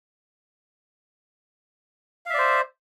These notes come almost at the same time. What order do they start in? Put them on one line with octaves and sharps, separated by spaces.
F5 E5 D5 C5